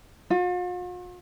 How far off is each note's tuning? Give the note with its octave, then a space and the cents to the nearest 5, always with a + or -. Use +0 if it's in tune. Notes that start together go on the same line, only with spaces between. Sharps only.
F4 +45